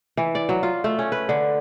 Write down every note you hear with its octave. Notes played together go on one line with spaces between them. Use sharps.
E3
D5
F#3
F4
A3
C#4
B4
D3